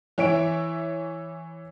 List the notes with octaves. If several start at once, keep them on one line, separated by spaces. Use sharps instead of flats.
E3 C#5 E5 D7